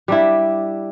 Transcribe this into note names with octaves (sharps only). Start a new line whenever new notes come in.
G3 D4 E4